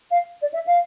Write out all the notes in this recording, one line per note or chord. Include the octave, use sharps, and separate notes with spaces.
F5
D5
E5
F5